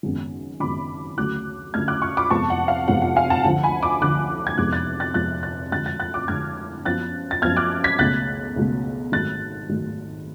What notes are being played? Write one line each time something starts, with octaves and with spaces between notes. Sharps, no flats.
G#1 F#2 C#3 G#3 B3
G#1 F#2 C#3 G#3 B3 B5 D6
D2 C#3 F#3 A3 D6 F#6
D2 C#3 F#3 A3 F6 G#6
D6 F#6
C#6 F6
B5 D6
F1 F2 F3 G#3 B3 A5 C#6
F#5
F5
F1 F2 F3 G#3 B3 F#5
F#5
F5 G#5
F#5 A5
D2 D3 F3 F#5
G#5 B5
B5 D6
D2 D3 F3 D6 F#6
G#6
F1 F2 F3 G#3 B3 D6 F#6
F#6 A6
F#6 A6
F1 F2 F3 G#3 B3 F#6 A6
F#6 A6
F2 D3 G#3 F#6 A6
F#6 A6
F#6 A6
D6 F#6
F2 D3 G#3 F6 G#6
F#2 F3 B3 F#6 A6
A6
F#2 F3 B3 F6 G#6
D6 F#6
G#6 B6
C#2 B2 A3 F#6 A6
C#2 B2 A3
G#1 G#2 F#3 A3 F#6 A6
G#1 G#2 F#3 A3